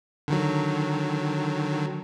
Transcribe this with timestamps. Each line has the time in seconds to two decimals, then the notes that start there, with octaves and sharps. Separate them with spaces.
0.28 D3 D#3 F#3